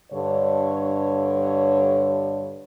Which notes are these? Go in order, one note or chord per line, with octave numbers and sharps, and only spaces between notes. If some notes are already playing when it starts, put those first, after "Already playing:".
G2 D3 C#5